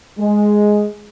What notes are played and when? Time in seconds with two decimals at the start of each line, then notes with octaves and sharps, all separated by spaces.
0.18 G#3